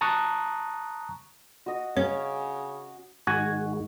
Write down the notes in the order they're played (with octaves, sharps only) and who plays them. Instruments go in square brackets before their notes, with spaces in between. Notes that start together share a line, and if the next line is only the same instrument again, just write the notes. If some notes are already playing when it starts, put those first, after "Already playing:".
[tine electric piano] A5 A#5 C#6 D#6 F#6
[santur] F#4 D#5
[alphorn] C#3 [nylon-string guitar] C#4 [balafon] C#5
[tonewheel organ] G#2 D#3 G#3 [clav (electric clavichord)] F#4 G#5